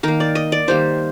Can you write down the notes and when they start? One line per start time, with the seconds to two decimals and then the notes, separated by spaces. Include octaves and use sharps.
0.03 D#3 A#3 A#4
0.20 D5
0.35 D#5
0.52 D5
0.68 D#3 G3 A#3 C5